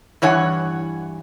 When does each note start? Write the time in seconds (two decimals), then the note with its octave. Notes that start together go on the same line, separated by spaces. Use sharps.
0.22 G2 E3 C#5 F#5 G#5